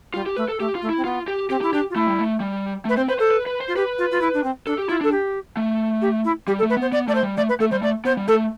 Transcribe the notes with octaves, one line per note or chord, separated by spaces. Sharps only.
G3 F4
G4
A3 B4
A4
A3 G4
F4
A3
E4
C4
B3 F4
G4
C4 G4
E4 G4
D4 G4
F4
A3 E4
G3
A3
G3
A3
B4
C4 C5
B4 C5
A4 C5
B4
B4
C5
F4
G4 B4
F4
F4
E4
D4
C4
D4 A4
G4
E4 F4
D4 A4
G4
A3
G4
E4
G3 G4
A4
A3
B4
B3 C5
B3 D5
A3 D5
C5
G3
A3 D5
B4
A3 A4
G3 C5
A3 D5
B3 C5
G3
A3 A4